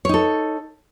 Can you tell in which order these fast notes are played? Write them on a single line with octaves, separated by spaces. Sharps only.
C#5 D#4 A4